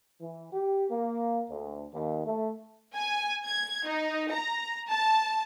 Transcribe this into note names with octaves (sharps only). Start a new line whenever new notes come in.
E3
G4
A#3
D2
D#2
A3
G#5
G#6
D#4
A#5
A5